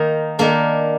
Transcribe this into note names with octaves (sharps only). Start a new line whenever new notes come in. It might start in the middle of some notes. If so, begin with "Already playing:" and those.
Already playing: D#3 A#3 D#4
D#3 A#3 D4